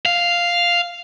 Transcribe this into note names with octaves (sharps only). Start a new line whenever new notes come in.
F5